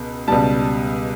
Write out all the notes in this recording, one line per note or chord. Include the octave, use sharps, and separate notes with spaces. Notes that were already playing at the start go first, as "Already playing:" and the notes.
Already playing: C#2 B2
C#2 B2 G3 A5